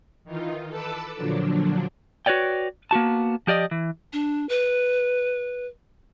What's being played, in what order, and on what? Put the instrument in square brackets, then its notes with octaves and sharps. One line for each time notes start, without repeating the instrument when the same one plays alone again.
[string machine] D#3 E3 D#4 F4
A4 B4 A5 D6 E6
A#2 D3 F3 F#3 D4
[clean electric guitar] F#4 B4 C#5 D5 G5
A#3 B3 F#4 A5
F3 G4 D5 D#5
E3
[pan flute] D4
B4